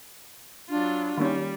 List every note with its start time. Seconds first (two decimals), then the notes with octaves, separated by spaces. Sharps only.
0.70 F#3 D4 F4
1.18 D#3 G3 A#3 C#4